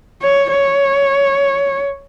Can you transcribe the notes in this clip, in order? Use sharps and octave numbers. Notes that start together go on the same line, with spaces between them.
C#5
C#5